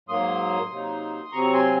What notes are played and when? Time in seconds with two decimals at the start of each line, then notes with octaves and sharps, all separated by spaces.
0.09 G#2 F#3 A#3 C6 D#6
0.70 C3 F#3 A#3 D#4
1.32 C3 F#3 C4 A#5 C#6
1.53 G#5 C6